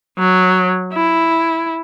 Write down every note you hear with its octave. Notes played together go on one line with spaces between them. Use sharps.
F#3
E4